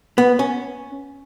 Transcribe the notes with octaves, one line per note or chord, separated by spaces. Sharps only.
B3
C#4